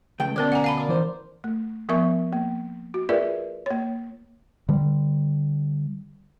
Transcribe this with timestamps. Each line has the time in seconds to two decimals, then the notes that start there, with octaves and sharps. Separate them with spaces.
0.20 C#2 A3 G5
0.36 D2 B2 C#4 A#4 C5 D5
0.52 F#5 G#5 A#5
0.64 F5 A5 B5
0.77 A#4 D5
0.89 E3 C5
1.44 A3
1.89 F3 B3 A#4 E5 C#6
2.33 A#3
2.94 F#4
3.09 F4 G#4 A#4 B4 D5 E5
3.66 A#3 C#5
4.69 D3 G3